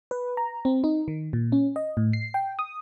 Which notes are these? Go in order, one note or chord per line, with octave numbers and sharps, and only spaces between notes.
B4
A#5
C4
D#4
D#3
A#2
C#4
D#5
A2
C7
G5
D#6